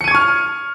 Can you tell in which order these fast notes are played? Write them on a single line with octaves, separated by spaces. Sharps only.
C#7 D#7 G#6 C#6 F6